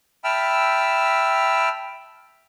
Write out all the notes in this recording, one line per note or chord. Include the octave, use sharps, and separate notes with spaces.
E5 G5 A5 B5 E6 F6